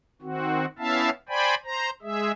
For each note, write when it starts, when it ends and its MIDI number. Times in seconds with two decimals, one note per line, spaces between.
0.22 0.66 51
0.22 0.66 60
0.22 0.66 66
0.79 1.10 59
0.79 1.10 61
0.79 1.10 64
0.79 1.10 76
0.79 1.10 77
0.79 1.10 81
1.29 1.55 72
1.29 1.55 74
1.29 1.55 79
1.29 1.55 80
1.29 1.55 83
1.65 1.90 72
1.65 1.90 82
2.02 2.32 56
2.02 2.32 68
2.02 2.32 76